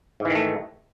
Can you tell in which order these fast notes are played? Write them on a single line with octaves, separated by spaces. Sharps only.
G#2 E3 D#3 A3